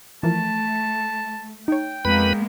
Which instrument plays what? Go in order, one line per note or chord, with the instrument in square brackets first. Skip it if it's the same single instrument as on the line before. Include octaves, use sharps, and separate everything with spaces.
[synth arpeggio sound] E3 F3 A#4 [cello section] A3 [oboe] A5
[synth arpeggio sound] D#4 C#5 [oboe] G5
[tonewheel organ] F2 B4 B5 [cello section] G#3 A#3 B3